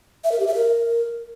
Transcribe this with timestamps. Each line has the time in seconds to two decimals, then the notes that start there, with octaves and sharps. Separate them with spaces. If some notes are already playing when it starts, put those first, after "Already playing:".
0.24 E5
0.32 A#4
0.39 G4
0.47 E5
0.55 A#4